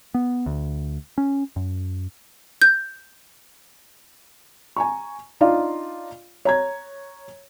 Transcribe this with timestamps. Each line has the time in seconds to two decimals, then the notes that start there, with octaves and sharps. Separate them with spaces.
0.14 B3
0.46 D2
1.18 C#4
1.56 F#2
2.62 G6
4.76 G#5 A#5 C#6
5.40 D4 D#4 F4 D5 F5
6.45 C#5 A#5 G#6